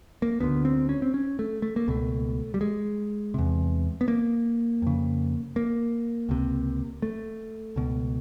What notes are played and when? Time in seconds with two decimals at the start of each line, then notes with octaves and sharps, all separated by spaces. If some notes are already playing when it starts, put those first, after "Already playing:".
0.22 A#3
0.40 D2 D3 B3
0.65 C4
0.89 C#4
1.02 C4
1.14 C#4
1.39 A3
1.62 A3
1.76 A#3
1.88 C#2 B2 A3
2.54 G3
2.61 G#3
3.34 E2 C3
4.01 B3
4.08 A#3
4.82 F2 C#3
5.56 A#3
6.29 C#2 C3
7.02 A3
7.76 C#2 B2